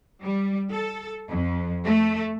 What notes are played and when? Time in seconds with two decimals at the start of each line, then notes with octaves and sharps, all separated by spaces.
0.22 G3
0.72 A4
1.29 F2
1.85 A3